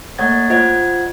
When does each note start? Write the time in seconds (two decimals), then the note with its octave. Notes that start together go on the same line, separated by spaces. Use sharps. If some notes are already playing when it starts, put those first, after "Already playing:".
0.18 A3 A#3 C#5 F#5 G#6 A6
0.50 F4 C5 D#5 F#5 G#6